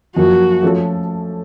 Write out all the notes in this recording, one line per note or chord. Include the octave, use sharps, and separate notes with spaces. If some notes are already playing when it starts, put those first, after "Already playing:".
F#2 F3 A#3 F#4
F3 A3 C#4 A4